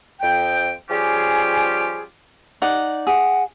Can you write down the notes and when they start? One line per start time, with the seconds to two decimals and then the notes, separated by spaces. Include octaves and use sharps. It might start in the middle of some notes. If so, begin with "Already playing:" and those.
0.21 F2 G5
0.89 F3 G3 C#4 F4 G4 G#4
2.62 D#4 D5 F#5
3.07 G#4 F#5